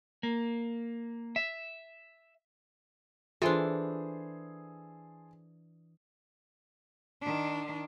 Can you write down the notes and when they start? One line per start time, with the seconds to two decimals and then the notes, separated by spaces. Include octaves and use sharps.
0.23 A#3
1.36 E5
3.42 E3 D4 F4 G#4 A4 C5
7.21 D#3 D4